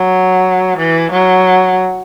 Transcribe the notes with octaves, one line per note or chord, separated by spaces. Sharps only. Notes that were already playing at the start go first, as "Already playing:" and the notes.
Already playing: F#3
E3
F#3